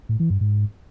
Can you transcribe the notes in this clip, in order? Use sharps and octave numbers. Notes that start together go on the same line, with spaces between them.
A2
E3
G2
G#2